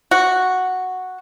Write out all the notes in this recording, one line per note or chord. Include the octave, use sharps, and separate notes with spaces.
F#4